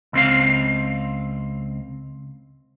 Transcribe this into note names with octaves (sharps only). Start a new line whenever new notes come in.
C#2 C4 F5